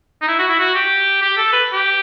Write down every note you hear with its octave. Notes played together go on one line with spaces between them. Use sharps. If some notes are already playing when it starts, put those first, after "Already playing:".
D#4
E4
F#4
E4
F#4
G4
G4
A4
B4
G4